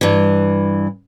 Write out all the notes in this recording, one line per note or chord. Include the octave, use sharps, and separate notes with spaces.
G2 E3